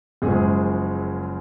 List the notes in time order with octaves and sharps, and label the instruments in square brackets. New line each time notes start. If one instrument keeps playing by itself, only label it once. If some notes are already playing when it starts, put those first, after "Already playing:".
[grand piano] F#1 F#2 F3 G#3 G#4